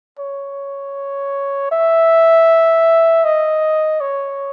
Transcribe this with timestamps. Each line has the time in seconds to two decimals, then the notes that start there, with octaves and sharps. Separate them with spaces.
0.19 C#5
1.71 E5
3.25 D#5
4.01 C#5